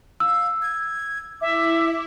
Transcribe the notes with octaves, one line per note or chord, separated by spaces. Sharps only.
F5 E6
G#6
E4 E5 D6